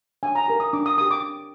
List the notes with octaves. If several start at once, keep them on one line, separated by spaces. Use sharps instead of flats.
D4 G#5
A#5
G4 A#4
D#6
D4 D6
D#6
G4 A#4 D#6
D6
D4